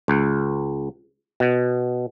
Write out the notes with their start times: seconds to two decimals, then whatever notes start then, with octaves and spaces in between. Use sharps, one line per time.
0.08 C#2
1.40 B2